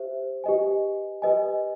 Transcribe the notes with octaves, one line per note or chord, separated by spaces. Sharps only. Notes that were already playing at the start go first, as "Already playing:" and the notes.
Already playing: G4 C5 E5
G4 B4 D#5 G#5
G4 B4 D#5 G#5